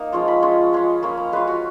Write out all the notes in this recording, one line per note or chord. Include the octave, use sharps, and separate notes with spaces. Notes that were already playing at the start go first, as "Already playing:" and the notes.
Already playing: A#3 D#4
F3 G#3 C#4 F4
B5
G#3 C#4 F4
G#3 C#4 F4
A#3 C#4 F4 B5
A#5
G#3 C#4 F4 B4
F#4